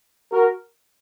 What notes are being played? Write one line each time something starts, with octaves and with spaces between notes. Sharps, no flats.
F#4 A#4